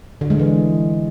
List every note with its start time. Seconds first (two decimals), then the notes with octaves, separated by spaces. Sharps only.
0.21 D3
0.30 G#3
0.39 E3